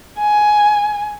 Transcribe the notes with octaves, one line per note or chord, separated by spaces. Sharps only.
G#5